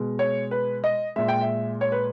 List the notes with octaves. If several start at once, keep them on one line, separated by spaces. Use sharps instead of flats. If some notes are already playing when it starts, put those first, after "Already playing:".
Already playing: B2 G#3
C#5
B4
D#5
A#2 G#3 E5
G5
E5
C#5
B4